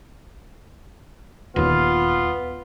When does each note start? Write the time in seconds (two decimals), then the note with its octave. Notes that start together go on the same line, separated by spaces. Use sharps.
1.56 D#1 D#2 B3 F4